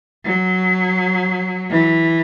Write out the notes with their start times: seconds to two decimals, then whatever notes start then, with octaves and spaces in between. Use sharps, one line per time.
0.25 F#3
1.70 E3